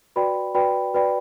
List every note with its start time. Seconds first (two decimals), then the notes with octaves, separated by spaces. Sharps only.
0.16 F#4 B4 D5 G5 B5
0.55 F#4 B4 D5 G5 B5
0.94 F#4 B4 D5 G5 B5